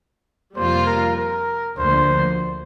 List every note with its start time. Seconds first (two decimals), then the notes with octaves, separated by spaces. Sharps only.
0.56 F2 C3 G3 A#3 F4 C5
0.86 A#4
1.17 A#4
1.77 D2 D3 F3 A#3 C5